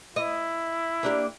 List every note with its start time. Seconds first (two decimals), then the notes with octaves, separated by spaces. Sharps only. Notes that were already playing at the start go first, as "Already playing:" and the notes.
0.16 E4 D#5
1.03 A#3 D4 G4